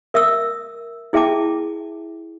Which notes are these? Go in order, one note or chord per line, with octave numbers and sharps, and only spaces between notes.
A#4 E5 D#6 E6
E4 G#4 E5 G5 A5 D6